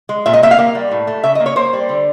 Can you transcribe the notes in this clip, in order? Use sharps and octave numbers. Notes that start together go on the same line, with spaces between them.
G#3
A#2 E5
D#5
A#3 E5
F5
A#3
G3
A2
A3
C#3 E5
D#5
A#3
C#5
A#3 C5
G3
D3